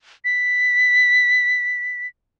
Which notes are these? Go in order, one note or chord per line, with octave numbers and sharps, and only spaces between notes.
B6